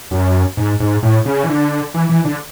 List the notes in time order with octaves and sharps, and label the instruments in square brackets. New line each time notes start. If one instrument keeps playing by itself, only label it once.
[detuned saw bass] F#2
G#2
G#2
A2
C#3
E3
D3
E3
E3
D3